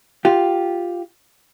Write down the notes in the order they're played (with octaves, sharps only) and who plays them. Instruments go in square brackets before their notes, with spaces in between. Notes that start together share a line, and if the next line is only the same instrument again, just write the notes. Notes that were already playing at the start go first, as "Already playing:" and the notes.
[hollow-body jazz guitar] F4 G4